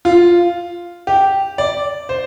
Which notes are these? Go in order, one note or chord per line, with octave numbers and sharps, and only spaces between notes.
F4
G4
D5
C5